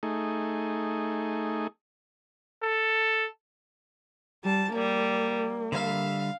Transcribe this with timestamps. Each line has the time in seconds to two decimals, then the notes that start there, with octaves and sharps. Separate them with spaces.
0.03 A3 D#4 G#4
2.63 A4
4.44 G3 A5
4.73 G3 A#3
5.72 D3 G3 E5 F5